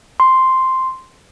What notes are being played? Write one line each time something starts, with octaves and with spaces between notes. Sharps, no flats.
C6